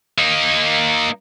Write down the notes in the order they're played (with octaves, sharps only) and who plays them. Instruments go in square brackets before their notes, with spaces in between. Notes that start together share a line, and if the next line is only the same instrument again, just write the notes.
[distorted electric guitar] A#3 D#4